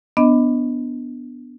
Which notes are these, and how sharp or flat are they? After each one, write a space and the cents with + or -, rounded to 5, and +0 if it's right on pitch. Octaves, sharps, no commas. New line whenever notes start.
B3 +0 D4 +0 D#5 +10